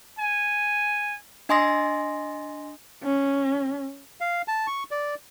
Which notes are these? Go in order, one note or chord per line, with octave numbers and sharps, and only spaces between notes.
G#5
D4 D#5 G#5 C6 D#6 A#6
C#4
F5
A5
C#6
D5